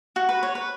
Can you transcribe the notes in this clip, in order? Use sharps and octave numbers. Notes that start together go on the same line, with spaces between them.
F#4
B4
C#5
B4